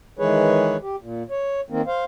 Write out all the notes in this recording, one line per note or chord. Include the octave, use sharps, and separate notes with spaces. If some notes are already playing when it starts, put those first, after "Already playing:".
D#3 E3 G#3 G#4 B4 C#5
G4
A#2
C#5
D#3 A#3 C4
C5 F5